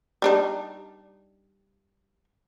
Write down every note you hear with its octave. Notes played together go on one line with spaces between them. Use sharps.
G3 D4 D#4